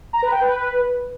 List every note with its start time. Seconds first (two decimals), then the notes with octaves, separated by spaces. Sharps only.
0.13 A#5
0.23 B4
0.32 G5
0.41 B4